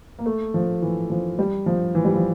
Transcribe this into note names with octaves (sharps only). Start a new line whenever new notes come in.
A#3
A3
F3
E3
F3
G3
F3
E3
G3
F3